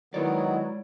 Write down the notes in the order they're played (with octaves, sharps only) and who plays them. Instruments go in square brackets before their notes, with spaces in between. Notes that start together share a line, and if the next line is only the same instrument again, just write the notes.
[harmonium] D#3 B3 [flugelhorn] F#3 [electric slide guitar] G#3 C#5 D5 [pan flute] E4